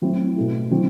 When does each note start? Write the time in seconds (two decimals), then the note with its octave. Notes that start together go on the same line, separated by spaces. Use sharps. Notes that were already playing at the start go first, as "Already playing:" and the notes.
0.02 A2 F#3 C4 E4
0.36 B2 A3 E4
0.71 D3 F#3 C4 E4